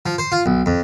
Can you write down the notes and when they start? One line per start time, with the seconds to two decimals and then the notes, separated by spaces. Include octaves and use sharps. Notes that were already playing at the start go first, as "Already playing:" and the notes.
0.06 F3
0.18 C5
0.32 F4
0.46 B1
0.66 F2